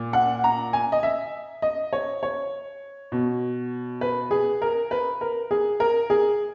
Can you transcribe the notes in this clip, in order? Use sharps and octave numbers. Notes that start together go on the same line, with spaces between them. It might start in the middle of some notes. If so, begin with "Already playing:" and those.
Already playing: A#2
F#5
A#5
G#5
D#5
E5
D#5
C#5
C#5
B2
B4
G#4
A#4
B4
A#4
G#4
A#4
G#4